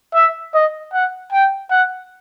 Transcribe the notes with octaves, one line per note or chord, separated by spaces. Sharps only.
E5
D#5
F#5
G5
F#5